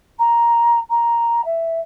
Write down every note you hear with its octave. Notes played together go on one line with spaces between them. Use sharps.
A#5
A#5
E5